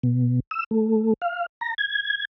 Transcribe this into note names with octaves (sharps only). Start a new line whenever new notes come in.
B2
E6
A3
F5
A#5
G#6